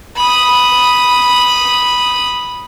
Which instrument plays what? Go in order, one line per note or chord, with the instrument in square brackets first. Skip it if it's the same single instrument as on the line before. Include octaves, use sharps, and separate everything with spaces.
[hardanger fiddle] B5 D#6